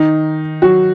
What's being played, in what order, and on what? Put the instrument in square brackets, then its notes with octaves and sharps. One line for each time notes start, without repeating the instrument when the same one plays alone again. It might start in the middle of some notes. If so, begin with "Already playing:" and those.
Already playing: [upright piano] D#3 D#4
F#3 F#4